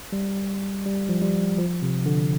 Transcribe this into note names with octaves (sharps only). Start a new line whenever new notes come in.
G3
G3
F3
G3
F3
C3
D3